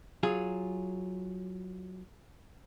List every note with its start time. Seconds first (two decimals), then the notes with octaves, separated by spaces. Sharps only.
0.23 F#3 F4 G#4